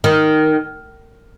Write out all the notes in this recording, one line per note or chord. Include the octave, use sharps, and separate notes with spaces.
D#3